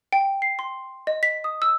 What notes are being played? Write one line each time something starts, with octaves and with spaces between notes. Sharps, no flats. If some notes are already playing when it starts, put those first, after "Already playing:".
G5
C7
C6
D#5
B6
D#6
E6